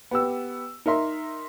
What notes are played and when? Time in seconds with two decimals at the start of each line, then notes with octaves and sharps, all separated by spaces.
0.11 B3 G4 E6
0.86 D#4 A#4 E5 C6